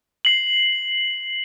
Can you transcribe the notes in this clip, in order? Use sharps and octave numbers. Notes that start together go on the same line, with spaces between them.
C7 F#7